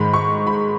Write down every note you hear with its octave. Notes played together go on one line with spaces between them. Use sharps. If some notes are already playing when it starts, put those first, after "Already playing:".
Already playing: G#2 D#3 G#3 B5
C#6
B5